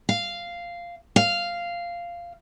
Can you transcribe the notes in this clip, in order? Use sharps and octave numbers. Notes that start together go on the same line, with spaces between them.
F5
F5